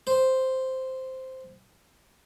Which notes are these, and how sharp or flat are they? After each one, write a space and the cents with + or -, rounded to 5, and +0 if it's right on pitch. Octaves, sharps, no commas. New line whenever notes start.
C5 -5